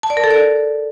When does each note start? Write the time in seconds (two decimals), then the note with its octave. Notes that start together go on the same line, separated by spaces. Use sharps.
0.03 A5
0.10 D5
0.17 A#4
0.24 A4
0.30 D5